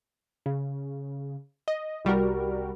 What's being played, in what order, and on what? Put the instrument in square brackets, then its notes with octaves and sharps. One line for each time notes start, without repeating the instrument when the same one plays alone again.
[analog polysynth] C#3
D#5
C2 G3 F#4 A#4